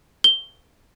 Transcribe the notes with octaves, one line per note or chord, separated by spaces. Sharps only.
G7